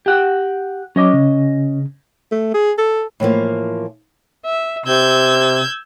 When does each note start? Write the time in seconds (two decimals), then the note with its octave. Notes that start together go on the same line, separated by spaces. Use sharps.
0.06 G4 F#5 G5
0.96 F#3 C#4 C#5 D#5 D6
1.14 C#3
2.31 A3
2.54 G#4
2.78 A4
3.20 A2 E3 F3 A#3
4.45 E5
4.86 C3 E6 G6 G#6